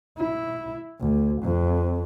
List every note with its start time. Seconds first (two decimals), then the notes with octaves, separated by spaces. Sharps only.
0.18 E4
1.00 D2
1.42 F2